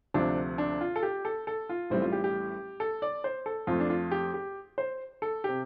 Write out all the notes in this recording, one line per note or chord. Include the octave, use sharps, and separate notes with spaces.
D2 C3 F3 D4
D4
F4
A4
G4
A4
A4
F4
A1 A2 G3 C4
F4
G4
G4
A4
D5
C5
A4
F2 F3 A3 F4
D4
F4
G4
G4
C5
A4
C3 G4